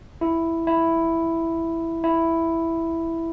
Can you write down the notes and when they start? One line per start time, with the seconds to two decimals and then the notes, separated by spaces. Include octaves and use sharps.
0.21 E4
0.67 E4
2.04 E4